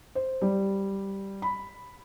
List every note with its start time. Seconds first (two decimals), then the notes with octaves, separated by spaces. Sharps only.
0.15 C5
0.42 G3
1.42 B5